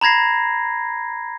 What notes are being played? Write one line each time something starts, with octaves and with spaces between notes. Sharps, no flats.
A#5 B5 G#6 A#6 C7